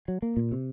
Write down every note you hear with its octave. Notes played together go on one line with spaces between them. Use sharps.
F#3
A#3
A#2
C3